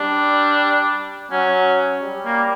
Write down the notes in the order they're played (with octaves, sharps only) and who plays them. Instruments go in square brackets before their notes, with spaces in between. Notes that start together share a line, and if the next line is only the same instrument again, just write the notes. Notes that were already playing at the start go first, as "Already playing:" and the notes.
Already playing: [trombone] G3 [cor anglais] D4
[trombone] F#3 [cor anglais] C#4
[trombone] G3
[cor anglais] A#3